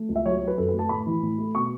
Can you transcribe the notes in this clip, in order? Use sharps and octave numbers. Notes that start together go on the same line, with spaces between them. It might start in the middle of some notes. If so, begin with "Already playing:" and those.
Already playing: A3
C#2
E5
F#3 C#5
C#5
F#3
B4
F#2 A4
B4
A3
A5
A2 B5
E3
A2
A3
B2 C#6